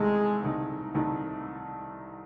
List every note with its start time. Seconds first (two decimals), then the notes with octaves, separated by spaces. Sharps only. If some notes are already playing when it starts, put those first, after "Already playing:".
Already playing: C2 C3 D#3 G#3 A3 D#4
0.42 C2 C3 D#3 A3 D#4
0.94 C2 C3 D#3 A3 D#4